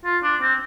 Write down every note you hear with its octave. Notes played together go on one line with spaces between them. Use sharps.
F4
D4
C4